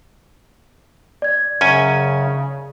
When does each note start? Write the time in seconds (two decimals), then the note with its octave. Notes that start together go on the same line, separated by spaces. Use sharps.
1.22 D5 G#6
1.61 F#2 C#3 C#4 G#5